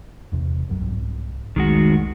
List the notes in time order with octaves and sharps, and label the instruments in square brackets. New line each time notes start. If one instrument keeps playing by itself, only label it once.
[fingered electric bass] E1 E2 C3
C2 F#2 F#3
C2 G#2
[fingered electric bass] C2 F2 A3 [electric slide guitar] D#3 G#3 F#4